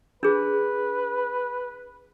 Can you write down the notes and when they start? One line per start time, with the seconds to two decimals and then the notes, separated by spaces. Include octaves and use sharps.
0.23 D4 G#4 B4